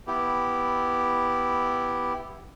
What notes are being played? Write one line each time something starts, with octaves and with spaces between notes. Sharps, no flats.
B3 E4 G4